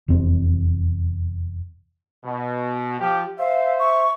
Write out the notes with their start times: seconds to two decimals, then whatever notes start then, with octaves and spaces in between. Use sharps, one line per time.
0.08 F1 E2 C4
2.24 B2
3.00 F3 G4
3.39 C5 E5 F5
3.79 C#6